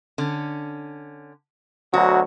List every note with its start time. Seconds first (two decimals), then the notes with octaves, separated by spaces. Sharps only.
0.18 D3 C#4
1.94 D2 B2 F#3 F#4